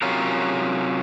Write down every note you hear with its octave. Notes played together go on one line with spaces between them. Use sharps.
C3 F#3 C#4 F4 A#4